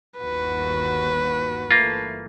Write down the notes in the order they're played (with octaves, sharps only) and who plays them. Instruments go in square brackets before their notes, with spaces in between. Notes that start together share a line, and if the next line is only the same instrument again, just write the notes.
[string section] G1 D#2 F#4 [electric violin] B4
[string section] G1 E3 A3 [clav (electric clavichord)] A#3 F4